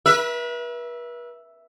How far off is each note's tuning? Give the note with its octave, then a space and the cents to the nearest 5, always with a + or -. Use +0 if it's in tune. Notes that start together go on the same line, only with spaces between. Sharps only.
B4 -40 E5 +0